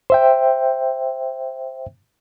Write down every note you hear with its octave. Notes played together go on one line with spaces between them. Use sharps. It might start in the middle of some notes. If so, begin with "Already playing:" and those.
C5 E5 G5